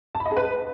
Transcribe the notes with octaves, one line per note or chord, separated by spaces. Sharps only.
A5
B5
D#5
G#4
B4